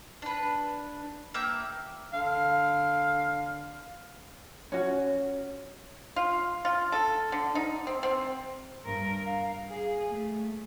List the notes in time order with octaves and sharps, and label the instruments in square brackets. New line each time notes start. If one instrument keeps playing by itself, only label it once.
[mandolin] D4 B4
A#3 E5 G5
[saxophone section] D3 F5
[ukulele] C#4 F#4
[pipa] F4
F4
A4
D3
D#4
C4
C4
[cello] G2 A#4
F5
G#4
A3